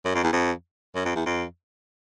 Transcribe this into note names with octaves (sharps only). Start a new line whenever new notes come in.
F#2
F2
E2
F2
F#2
F2
E2
F2